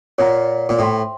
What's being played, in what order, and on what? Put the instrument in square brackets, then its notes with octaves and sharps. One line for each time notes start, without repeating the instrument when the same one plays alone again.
[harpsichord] A#2 [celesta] C#5 F#5 A#5
[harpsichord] A#2
[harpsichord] A2 [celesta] C5 E5 G5 C6